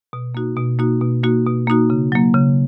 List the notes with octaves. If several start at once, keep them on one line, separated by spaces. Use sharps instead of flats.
B2
A#3 D#4 F#4
B2
A#3 D#4 F#4
B2
A#3 D#4 F#4
B2
A#3 D#4 F#4
C#3
F#3 A#3
C#3